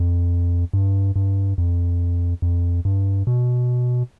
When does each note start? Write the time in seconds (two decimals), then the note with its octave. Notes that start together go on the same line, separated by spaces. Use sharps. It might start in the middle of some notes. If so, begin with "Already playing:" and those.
Already playing: F2
0.73 G2
1.16 G2
1.58 F2
2.42 F2
2.85 G2
3.27 B2